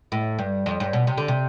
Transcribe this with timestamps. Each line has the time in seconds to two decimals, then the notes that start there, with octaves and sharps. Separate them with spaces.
0.12 A2
0.39 G2
0.66 F2
0.80 G2
0.93 B2
1.07 C3
1.18 D3
1.28 C3